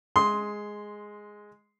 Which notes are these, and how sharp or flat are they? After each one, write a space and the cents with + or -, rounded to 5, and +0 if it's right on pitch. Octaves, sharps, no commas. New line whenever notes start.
G#3 +0 C6 +0 D#6 +20